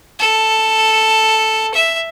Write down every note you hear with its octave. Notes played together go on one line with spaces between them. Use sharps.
A4
E5